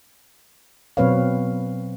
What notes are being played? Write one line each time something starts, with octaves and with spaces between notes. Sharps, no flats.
B2 F#3 C4 B4 C#5 F5